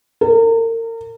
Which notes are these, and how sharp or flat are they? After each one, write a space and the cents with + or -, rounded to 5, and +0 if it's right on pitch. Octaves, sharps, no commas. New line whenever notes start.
A#4 -35